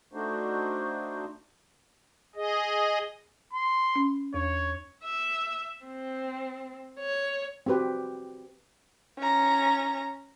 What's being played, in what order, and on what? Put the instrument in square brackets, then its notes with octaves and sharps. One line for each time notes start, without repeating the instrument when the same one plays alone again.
[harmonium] A3 D4 D#4 F#4 C5
[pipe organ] G#4 D#5
[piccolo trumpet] C6
[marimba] C#4
[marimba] E2 [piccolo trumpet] C#5
[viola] E5
C4
C#5
[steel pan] C4 F#4 G4 B4 C5
[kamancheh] C#4 A#5